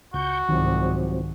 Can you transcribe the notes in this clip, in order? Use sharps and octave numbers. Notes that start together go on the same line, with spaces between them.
C#2 F#4 C#6 G6
C2 G#2 D#3 F3 F#3 C4